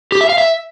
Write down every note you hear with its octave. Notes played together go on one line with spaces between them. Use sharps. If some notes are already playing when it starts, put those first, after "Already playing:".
G4
E5
F5
E5